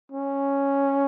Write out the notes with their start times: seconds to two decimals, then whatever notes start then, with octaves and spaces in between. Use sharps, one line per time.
0.12 C#4